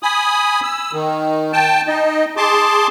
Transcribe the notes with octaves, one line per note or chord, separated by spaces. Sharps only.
G#5 B5 D#6
E6
D#3
G5 A5
D#4 D#5
G#4 A5 C6 D6